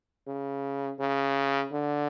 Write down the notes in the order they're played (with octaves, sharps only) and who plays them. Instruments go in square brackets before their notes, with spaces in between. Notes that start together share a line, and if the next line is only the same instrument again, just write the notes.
[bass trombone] C#3
C#3
D3